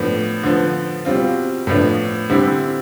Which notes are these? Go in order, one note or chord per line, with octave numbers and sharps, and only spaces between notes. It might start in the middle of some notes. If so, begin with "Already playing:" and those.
Already playing: A2 F3 B3 D4
D3 F3 B3
B2 G3 C4 F4
A2 F3 B3 D4
D3 G3 C4 E4